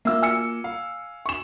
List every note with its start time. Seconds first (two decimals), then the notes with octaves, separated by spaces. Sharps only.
0.05 A#3 F4 E5 E6
0.22 G#5 E6 C#7
0.64 F5
1.26 C#6 E7